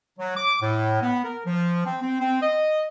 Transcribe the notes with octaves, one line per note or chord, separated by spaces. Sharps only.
F#3
D6
A2
B3
A#4
F3
C4
C4
C4
D#5